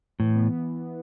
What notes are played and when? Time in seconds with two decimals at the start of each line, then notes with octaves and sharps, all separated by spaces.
0.20 A2 E3
0.35 B3